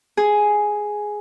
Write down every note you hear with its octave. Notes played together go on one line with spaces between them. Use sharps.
G#4